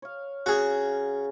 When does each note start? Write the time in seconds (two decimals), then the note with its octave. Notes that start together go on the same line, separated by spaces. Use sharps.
0.02 C#5 F5
0.46 C#3 F#4 G#4